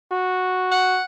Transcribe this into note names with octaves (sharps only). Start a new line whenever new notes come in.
F#4
F#5